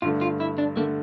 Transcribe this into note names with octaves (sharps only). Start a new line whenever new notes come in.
G2 D3 A3 F4
F4
E4
D4
D3 A3 A#3